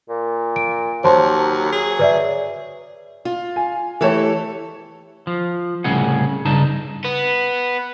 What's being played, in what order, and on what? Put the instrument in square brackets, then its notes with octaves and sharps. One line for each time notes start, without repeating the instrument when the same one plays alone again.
[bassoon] A#2
[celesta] D7
[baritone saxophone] D#2 [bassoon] F#3 [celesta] C5 A5 C6
[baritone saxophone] G#4
[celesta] B4 D5 E5
[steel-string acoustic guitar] F4
[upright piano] G#5
[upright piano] E3 A3 C#5 [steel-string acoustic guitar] E4 G4 A4
[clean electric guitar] F3
C2 A2 C#3 G#4 F#5
G2 C#3 D#4 A5
[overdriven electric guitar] B3